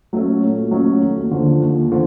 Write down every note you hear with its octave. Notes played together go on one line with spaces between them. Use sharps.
F#3 A3 C#4
A#2
F#3 A3 C#4
D#2
D3 F3
D#2
D3 F3